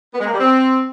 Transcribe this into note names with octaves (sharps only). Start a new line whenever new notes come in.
B3
G#3
A#3
G3
C4